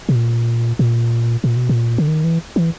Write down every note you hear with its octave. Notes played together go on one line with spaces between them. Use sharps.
B2
A#2
A#2
A#2
B2
A#2
D3
D#3
E3
E3